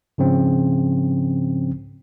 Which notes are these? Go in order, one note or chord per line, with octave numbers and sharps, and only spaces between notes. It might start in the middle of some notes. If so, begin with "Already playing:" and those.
G#2 C#3 F3 C4 C#4